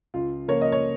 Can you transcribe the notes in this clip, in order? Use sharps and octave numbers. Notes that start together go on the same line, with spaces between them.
C#2 F4
C#3 F3 A#3 A#4 C#5
D#5
C#5